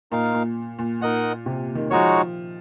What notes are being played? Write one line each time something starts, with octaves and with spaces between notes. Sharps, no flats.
A#2 D#4 A#4 F5
A#2
A#2
A#2 D#4 A#4 D#5 F#5
C3
D#3
F3 G#3 D#4 F#4 C#5